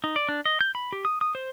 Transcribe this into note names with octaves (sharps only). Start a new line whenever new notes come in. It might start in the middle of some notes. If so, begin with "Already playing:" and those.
D#4
D5
D4
D#5
G6
B5
G4
D#6
D#6
C5